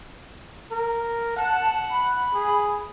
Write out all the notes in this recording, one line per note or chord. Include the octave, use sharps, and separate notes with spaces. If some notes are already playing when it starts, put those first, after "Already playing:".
A#4
F#5 A5
B5
G#4